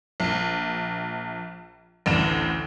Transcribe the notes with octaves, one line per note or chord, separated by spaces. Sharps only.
A#1
A1 D2 E7